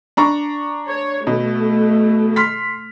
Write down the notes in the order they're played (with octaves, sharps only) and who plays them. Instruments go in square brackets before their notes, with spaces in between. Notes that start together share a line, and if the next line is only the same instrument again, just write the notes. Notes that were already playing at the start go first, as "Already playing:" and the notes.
[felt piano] D4 A#5 C#6
[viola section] C#5
[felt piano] B2 [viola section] A3
[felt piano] C6 F6 B6